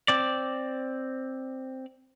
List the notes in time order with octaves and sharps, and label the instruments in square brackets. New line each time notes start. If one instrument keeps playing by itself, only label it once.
[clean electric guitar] C4 D5